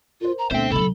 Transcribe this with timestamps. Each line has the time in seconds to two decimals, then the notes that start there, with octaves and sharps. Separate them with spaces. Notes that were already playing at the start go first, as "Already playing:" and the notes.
0.21 F4 A#4 C5
0.38 A#5
0.51 D2 B2 C4 C5 E5 G5
0.71 C#3 F#3 A4 B5